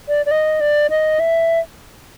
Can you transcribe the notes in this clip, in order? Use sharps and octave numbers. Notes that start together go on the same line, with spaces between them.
D5
D5
D#5
D5
D#5
E5